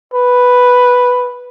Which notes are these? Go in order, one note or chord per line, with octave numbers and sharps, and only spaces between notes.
B4